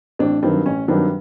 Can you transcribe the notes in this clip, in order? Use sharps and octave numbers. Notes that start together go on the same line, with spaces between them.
A1 C4 D4
G2 D#3 F#3 C4
A1 C#4
G2 D#3 F#3 C4 D4